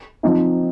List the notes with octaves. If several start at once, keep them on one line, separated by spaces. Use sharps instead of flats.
F3 C4 D#4